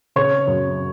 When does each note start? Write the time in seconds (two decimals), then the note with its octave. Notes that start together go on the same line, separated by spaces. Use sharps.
0.16 C#3 C#5
0.47 F#2